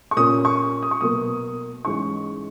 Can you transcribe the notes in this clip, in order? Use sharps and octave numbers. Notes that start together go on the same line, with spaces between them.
C#6
A#2 A#3 C#4 D#6
C#6
D#6
C#6
B2 F#3 A#3 D#6
G#2 E3 G#3 C#4 C#6